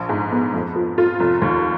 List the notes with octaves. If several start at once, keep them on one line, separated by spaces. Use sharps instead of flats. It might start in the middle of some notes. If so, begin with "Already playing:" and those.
Already playing: A#1
G#2
B3
F2
F3
F4
F1
D#2